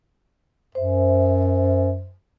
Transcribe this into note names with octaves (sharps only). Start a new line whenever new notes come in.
F#2 C5 E5